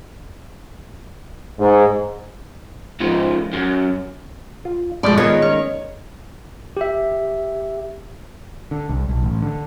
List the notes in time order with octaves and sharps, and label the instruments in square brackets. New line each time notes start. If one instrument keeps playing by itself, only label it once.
[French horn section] G#2
[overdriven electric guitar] G#2 F3
F#2
[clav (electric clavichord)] F4
[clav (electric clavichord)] B2 F3 A3 [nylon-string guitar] G#3 D5
[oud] D#3 G#3 [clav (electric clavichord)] B3 F4 G#4 [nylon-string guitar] C#5
[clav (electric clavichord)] C#4 [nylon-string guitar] C#5
[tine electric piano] G4 E5
[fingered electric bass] D3
C2
B1
A1
D3